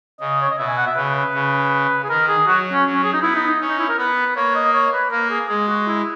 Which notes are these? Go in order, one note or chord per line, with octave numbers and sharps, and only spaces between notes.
C#3 D#5
C#5
D#5
B2 E5
G#5
F#5
E5
C#3 B4
B4
C#3
G#4
D#3 A#4
G#4
F#3 F#4
C#4
F#3
C#4
G#4
D#4
B3 E4
D#4
D#4
C#4
D#4
E4
A#4
B3 B4
A#3 C#5
D#5
C#5
B4
A#3 A#4
G#4
G#3 G#4
F#4
E4